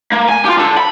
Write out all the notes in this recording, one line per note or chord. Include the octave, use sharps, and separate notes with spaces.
A#3
G#5
F4 G4
D4 A4
B5